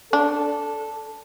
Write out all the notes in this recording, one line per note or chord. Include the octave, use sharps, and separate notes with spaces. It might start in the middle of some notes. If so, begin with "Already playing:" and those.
D4 A4